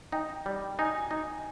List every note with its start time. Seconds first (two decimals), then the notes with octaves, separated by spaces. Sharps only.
0.12 D#4 G5
0.46 G3
0.79 D#4 G#5
1.11 D#4